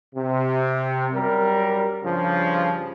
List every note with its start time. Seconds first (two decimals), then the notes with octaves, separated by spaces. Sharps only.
0.15 C3
1.13 F#2 G3 A#4
2.02 G2 C#3 F3